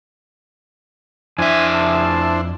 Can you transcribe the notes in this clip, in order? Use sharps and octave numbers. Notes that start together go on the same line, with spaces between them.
F2 D4 E4 C5 E5 G#5
A5